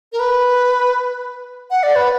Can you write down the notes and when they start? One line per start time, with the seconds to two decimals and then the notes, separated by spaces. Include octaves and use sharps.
0.12 A#4
0.19 B4
1.70 F#5
1.83 D5
1.95 B4